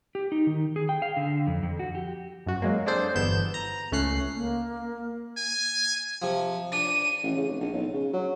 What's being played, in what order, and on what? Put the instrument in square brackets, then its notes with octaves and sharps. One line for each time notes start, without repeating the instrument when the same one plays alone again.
[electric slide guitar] G4
D#4
D#3
G#4
G5
F5
D3
F2
F2
F#4
G4
[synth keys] F#2 F#4
F#3 G#3 A#3
C4 D4 G#4 A4 C5 D5
G1 E2 B3 G6 E7
A#5
C#2 A3 C#4 F#6 C7
[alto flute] A#3
[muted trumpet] G#5
[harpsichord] C3 F3
[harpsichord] D4 [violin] D#7
[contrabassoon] A1
C#3
F1
A#1
B1
C#3
F#3